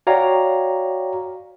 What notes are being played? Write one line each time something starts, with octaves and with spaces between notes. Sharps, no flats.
F#4 C#5 D5 F5 G5 A#5